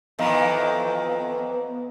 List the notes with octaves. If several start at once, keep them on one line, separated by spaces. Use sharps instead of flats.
F2 D#3 E3 B3 D#5 F5 A#5